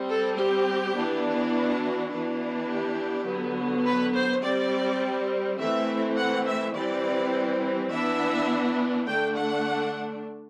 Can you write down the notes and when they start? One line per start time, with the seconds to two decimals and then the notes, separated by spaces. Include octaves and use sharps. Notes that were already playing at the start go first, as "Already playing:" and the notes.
Already playing: G3 C4
0.08 A4
0.36 G4
0.95 E3 B3 D4
1.52 F#4
2.11 E3 B3 D4
2.69 G4
3.26 D3 F#3 B3
3.85 B4
4.14 C5
4.42 G3 C4 D5
5.58 E3 A3 C4 E5
6.16 F#5
6.46 E5
6.74 E3 G3 C4 D5
7.90 E3 B3 D4 E5
9.07 D3 A3 D4 G5
9.35 F#5